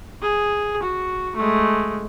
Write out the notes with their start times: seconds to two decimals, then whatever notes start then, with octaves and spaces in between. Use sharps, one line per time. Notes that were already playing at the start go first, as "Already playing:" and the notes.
0.22 G#4
0.83 F#4
1.36 G#3 A3